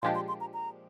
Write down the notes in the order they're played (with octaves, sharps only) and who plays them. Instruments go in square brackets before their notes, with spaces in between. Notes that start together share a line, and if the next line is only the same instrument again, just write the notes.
[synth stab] A#2 F3 G#3 D4 G4 [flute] C6
[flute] C6
C6
A#5
A#5